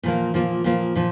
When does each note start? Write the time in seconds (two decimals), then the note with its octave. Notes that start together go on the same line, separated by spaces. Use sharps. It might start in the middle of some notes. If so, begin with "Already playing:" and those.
0.03 A#2 F3 A#3
0.34 A#2 F3 A#3
0.64 A#2 F3 A#3
0.96 A#2 F3